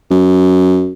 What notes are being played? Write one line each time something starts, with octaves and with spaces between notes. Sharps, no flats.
F#2